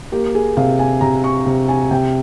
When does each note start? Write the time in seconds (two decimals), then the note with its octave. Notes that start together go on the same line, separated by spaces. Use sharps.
0.12 A#3 G4
0.35 G#4
0.57 C3 F5
0.79 G#5
1.01 C3 A#5
1.24 C#6
1.46 C3
1.68 G#5
1.91 C3 G5